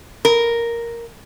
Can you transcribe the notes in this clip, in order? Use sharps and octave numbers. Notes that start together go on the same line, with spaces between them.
A#4